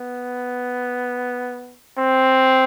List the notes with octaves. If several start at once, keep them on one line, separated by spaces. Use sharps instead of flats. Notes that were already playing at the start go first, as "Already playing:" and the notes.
Already playing: B3
C4